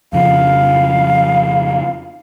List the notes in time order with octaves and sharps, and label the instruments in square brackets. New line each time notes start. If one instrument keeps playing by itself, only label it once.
[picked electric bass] F2 C#3 F3 [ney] F5